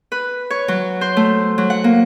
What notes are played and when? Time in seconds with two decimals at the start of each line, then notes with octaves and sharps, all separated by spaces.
0.12 B4
0.50 C#5
0.68 F#3
1.01 C5
1.17 A3
1.58 F#3
1.70 F#5
1.84 A#3